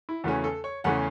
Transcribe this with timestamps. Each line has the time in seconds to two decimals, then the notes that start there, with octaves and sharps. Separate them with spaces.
0.09 E4
0.24 E2 C#3 E3 A3 C#4 F#4
0.44 A4
0.64 C#5
0.84 E2 C#3 E3 A3 C#4 F#5